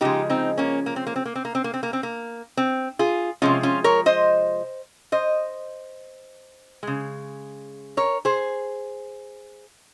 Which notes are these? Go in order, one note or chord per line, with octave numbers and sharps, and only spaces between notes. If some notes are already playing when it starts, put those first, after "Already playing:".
C#3 F3 G#3 D#4 G4
C4 D#4
A#3 C#4
A#3
C4
A#3
C4
A#3
C4
A#3
C4
A#3
C4
A#3
C4
A#3
C4
F4 G#4
C3 F3 G#3 C#4 F4
C#4 F4
A#4 C#5
C5 D#5
C5 D#5
C#3 G#3
A#4 C#5
G#4 C5